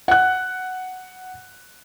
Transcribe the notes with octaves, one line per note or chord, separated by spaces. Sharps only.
F#5 F#6